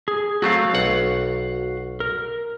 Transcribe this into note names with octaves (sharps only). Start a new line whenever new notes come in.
G#4
F#3 A3 C4 F#4 F5
B1 F#5
A#4